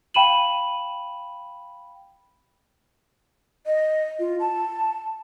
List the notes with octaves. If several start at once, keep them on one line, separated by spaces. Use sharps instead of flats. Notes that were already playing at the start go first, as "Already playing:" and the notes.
F5 G5 B5 D#7 E7 F#7
D#5
F4
A5